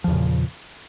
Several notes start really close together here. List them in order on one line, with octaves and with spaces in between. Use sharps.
F3 E2 C#3 A#2